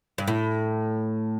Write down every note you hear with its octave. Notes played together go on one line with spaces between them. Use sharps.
G2
A2